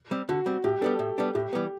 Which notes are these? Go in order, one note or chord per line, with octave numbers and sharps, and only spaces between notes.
G3 C4
D3 F#4
G3 C4
A2 G4
G3 B3 D4 A4
A2
G3 B3 D4
A2 G4
E3 G3 B3